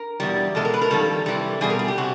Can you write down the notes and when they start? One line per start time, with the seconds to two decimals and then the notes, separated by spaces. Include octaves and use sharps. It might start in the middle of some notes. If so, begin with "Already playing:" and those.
Already playing: A#4
0.20 E2 B2 G3
0.55 B2 G#3 A4
0.65 A#4
0.74 B4
0.81 A#4
0.91 F2 C3 D#3 G3 A4
1.26 C3 E3 G3
1.61 B2 G3 G#4
1.70 A#4
1.79 G#4
1.88 G4
1.98 C3 F#4